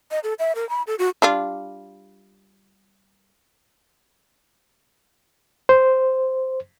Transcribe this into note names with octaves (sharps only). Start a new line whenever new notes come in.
D#5
A4
E5
A#4
B5
A4
F#4
G3 D4 F4
C5